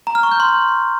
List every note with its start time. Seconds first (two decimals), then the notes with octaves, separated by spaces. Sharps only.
0.07 A#5
0.15 F6
0.23 C#6
0.32 G6
0.40 C6